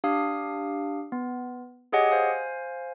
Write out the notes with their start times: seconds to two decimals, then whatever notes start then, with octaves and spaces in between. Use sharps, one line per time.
0.04 D4 G4 F5 D#6
1.12 B3
1.93 G4 G#4 C#5 D#5 F#5 G#5
2.11 C5 F5 G#5